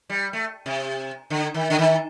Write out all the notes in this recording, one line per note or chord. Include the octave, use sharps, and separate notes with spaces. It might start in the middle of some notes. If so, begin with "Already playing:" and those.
G3
A3
C3
D3
D#3
D3
D#3